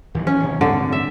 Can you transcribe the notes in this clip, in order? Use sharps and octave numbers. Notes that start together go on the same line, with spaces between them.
D#2 E3 F#3
C#4
D#2 C3
A1 G2 D3 C4
E5